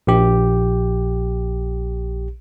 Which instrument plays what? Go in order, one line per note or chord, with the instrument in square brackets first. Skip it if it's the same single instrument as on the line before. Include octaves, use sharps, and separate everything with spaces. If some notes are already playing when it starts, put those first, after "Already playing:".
[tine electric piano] A#1 G4